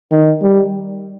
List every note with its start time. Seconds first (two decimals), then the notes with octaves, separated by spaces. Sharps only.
0.11 D#3
0.42 G3